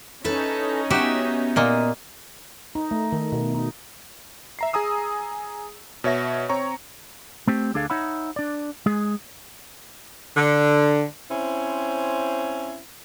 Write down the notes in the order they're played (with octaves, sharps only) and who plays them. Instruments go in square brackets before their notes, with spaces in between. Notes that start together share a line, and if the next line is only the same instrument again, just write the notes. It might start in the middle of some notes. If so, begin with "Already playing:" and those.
[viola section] C#4 D#4 [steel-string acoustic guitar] E4 A4 B4
[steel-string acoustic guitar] B3 E5 [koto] F#4 G4
[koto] A#2 A#3 D#5
[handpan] D#4
A3
D#3
B2
D#4
[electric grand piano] E5 A#5 C7
G#4 G#5 A#5 D#6 E6
B2 C#5 E5 A#6
C4 C#5 A#5 C#6
[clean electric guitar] A3 C4 G4
D2 D3 D4 G#4 A4 F5
D#4 C#5 E5 F#5 B5
D4 D5
G#3 G#4
[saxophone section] D3
C4 C#4 E4 C5